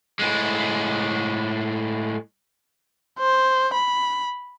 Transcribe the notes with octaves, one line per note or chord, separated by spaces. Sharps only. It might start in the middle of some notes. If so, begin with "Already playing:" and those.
A2 G#3
C5
B5